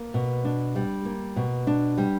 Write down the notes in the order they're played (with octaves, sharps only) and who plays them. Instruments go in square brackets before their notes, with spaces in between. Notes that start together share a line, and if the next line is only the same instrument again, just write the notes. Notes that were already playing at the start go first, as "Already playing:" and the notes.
Already playing: [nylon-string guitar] A#3
B2
D4
G3
A#3
B2
D4
G3